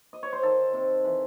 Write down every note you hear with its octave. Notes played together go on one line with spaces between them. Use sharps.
D#5
C#5
C5
D#3 A4
C3
E3